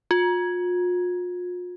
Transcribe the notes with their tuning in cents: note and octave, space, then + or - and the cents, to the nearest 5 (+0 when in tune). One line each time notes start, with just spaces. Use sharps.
F4 +40